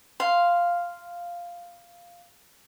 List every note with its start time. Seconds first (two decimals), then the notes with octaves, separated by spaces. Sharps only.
0.20 F5 C6